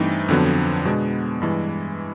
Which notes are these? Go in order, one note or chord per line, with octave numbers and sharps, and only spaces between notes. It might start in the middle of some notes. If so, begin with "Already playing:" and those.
Already playing: G2 E3 A3 C4 D#4
F2 D3 F#3 B3
B2 G#3 B3 D4
G2 E3 G#3